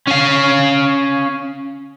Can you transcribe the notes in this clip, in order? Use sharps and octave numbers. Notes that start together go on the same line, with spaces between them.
C#4 F5